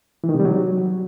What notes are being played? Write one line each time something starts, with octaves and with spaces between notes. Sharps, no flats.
E3
D#3
C3
G3
F#3